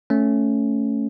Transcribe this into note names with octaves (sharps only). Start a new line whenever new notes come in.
A3 C#4